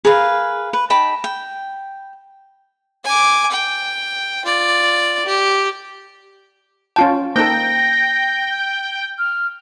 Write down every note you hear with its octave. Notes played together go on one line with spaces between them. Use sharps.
G#4 A#4 B4 F5
B4
D#4 G5 A5 B5
G5
G#5 D6
G5
F4 D5
G4
C#4 F4 G5 A5
A#3 D#4 A4 C5 G5 A#6
F6